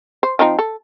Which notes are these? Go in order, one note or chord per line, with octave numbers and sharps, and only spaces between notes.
C5
F3 C4 D#4
A4